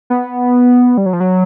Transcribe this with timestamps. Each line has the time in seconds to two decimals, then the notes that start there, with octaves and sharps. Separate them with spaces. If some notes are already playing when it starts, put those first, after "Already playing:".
0.10 B3
0.98 G3
1.06 F#3
1.13 F3
1.20 F#3